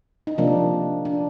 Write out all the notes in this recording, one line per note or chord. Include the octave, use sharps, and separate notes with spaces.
D#4
C3 F3 A#3 D4
D4